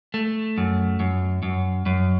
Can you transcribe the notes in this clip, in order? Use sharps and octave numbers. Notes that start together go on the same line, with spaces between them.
A3
F#2
F#2
F#2
F#2